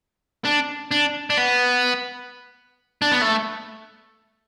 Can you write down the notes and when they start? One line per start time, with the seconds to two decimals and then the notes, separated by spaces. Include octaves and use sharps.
0.45 D4
0.91 D4
1.30 D4
1.38 B3
3.02 D4
3.12 B3
3.22 A3